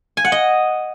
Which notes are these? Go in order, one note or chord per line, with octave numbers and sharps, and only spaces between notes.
G#5
F#5
D#5